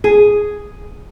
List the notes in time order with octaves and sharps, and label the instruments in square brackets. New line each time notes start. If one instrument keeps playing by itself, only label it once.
[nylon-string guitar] G#4